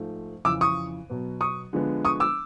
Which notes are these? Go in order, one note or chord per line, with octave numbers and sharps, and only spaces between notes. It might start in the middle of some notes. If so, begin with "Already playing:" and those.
Already playing: G#2 F3 A3
F2 C#3 E3 D6 E6
C#6 D#6
B2 F#3 B3
C#6 D#6
D3 F3 G#3 B3
C#6 D#6
D6 E6